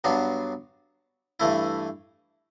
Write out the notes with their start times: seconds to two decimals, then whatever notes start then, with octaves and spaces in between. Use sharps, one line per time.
0.04 G2 F#3 B3 D4
1.40 G2 E3 A3 E4